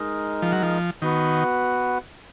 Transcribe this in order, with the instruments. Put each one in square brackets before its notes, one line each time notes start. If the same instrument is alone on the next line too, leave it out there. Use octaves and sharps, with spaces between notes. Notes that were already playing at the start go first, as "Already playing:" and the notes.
Already playing: [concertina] G#3 D#4 A#4 D#5
[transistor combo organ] F3
F#3
F3
[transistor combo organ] D#3 [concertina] B3 F#4 B4 F#5